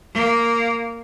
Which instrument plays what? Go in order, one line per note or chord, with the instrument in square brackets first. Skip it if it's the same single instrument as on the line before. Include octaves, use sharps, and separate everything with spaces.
[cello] A#3